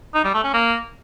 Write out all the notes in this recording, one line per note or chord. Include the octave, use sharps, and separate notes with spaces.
D#4
G3
A3
C#4
A#3